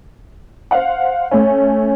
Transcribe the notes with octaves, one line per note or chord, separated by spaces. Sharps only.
C5 F5 F#5
A3 C#4